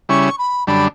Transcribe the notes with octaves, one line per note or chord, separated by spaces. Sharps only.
C#3 G3 C#4 E4 C#6
B5
F#2 D3 G3 D4 B5